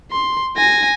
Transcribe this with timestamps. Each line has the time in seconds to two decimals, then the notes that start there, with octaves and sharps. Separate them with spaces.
0.12 C6
0.57 G#5 A#6